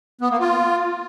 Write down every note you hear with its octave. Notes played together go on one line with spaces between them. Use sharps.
B3
A#3
F4